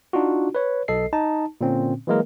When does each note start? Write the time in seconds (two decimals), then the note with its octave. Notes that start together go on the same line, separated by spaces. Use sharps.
0.13 D4 D#4 F4 F#4
0.55 B4 C#5
0.88 B1 A4 D#5 C7
1.13 D#4 A5
1.61 A#2 D3 C4 C#4
2.07 E3 F#3 G#3 A#3 A#4